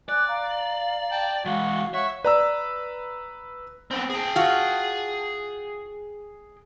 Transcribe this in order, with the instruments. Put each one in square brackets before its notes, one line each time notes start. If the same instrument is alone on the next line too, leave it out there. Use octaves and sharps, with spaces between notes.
[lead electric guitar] D5 [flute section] G#5 D6 F#6
[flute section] F5 A#5
[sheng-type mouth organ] G5 A5
[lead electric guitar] E3 G#3 [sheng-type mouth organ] F#4 [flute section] F5
[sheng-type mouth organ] C#5 F#5 C#6 [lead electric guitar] E5
[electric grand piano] B4 A#5 E6 [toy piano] D5
[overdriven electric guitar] B3 C4
G#4 G5
[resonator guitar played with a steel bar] F4 F#4